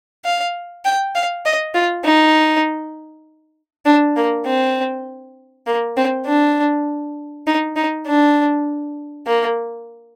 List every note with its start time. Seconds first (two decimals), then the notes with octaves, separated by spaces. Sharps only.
0.25 F5
0.85 G5
1.15 F5
1.46 D#5
1.75 F4
2.05 D#4
3.86 D4
4.16 A#3
4.46 C4
5.67 A#3
5.97 C4
6.26 D4
7.47 D#4
7.76 D#4
8.07 D4
9.27 A#3